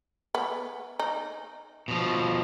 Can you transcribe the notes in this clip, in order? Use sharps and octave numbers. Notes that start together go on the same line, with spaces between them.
B3
D#4
B2 F3